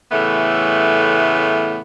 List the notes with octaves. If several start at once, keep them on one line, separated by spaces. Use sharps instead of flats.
A2 C#3 E3 A3 B3